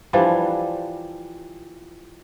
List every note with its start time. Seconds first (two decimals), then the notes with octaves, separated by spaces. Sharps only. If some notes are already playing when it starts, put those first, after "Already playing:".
0.13 E3 F3 G3 D4